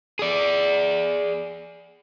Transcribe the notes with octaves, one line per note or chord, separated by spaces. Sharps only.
G#4 D5